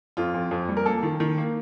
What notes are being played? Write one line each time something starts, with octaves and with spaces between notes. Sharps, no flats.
F2 F4
F2
F2
G3
A#4
A#3 A4
D#3
D#3
A#3